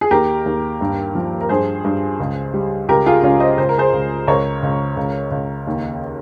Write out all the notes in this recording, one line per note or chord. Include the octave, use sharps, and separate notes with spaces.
G#4
D#2 G4 A#4
D#2
G2
F3
A#4
G2 G#4 C5
G2
C#2
G3
C#2 G4 A#4
F4 G#4
C#2 C#4 F4
C5 D#5
C#2 C5
A#4
G#4 C5
C#2
C#2 A#4 C#5
C#2
C#2
C#2
D#2